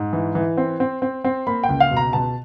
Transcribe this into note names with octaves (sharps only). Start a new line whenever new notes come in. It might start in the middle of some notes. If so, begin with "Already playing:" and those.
Already playing: G#2
E3
E3
C4
C4
C4
C4
A#3 B5
G5
C#2
F5
B2
A#5
B2 A5